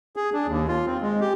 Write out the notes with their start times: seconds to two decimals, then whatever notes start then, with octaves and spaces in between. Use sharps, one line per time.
0.16 G#4
0.33 D4
0.47 D#2
0.68 F4
0.86 C4
1.01 G#3
1.21 G4